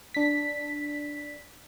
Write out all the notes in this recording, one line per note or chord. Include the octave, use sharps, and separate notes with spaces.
D4 B6